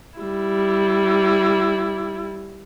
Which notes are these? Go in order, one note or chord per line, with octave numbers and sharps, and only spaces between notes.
G3 E4